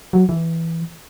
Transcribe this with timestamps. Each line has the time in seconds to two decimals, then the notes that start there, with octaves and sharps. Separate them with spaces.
0.13 F#3
0.29 E3